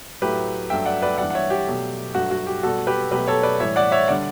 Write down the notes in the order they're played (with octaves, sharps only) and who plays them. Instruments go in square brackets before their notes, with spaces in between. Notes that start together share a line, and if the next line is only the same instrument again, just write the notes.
[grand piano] A2 F#3 A3 G4 B4
G2 F#3 A3 E5 G5
D5 F#5
B4 D5
G2 E3 G3 D5 F#5
F#5
C#5 E5
G4
B2 F#3 A3
G2 F#3 A3 F#4
F#4
G4
B2 G3 F#4 A4
G4 B4
B2 F#3 A3 G4 B4
A4 C#5
B4 D5
A2 E3 G3 C#5 E5
D5 F#5
C#5 E5
D3 G3 D5 F#5